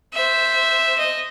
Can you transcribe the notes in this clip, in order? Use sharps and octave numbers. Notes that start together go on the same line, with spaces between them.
C5 E5
D#5